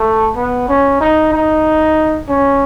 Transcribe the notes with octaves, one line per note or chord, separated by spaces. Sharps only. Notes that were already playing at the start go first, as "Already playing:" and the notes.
Already playing: A3
B3
C#4
D#4
D#4
C#4